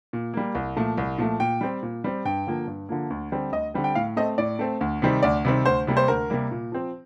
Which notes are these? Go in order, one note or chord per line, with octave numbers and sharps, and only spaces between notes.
A#2
G3 A#3
C2
A#2 F3 A3
C2
A#2 F3 A3
A#2 G5
G3 C4
A#2
G3 C4
G2 G5
D3 F3 A#3
G2
D3 F3 A#3
D2
D3 G3 C4
D2 D#5
D3 G3 C4
G5
A2 F5
A3 C4 D#5
A2 D5
A3 C4
D2
C3 D#3 G3 C4
D2 D5
C3 D#3 G3 C4
D2 C5
C3 G3 A#3
C5
D2 A#4
C3 G3 A#3
A#2
F3 C4